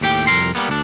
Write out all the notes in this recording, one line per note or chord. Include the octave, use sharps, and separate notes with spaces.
D#2 A2 G4 G5
C2 F2 A#4 C6
G3 A#3 B3
D2 D4